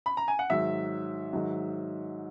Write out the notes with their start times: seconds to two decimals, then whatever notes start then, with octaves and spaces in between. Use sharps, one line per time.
0.06 B5
0.17 A#5
0.28 G#5
0.39 F#5
0.50 G#2 D#3 F#3 E5
1.33 G#2 D#3 F#3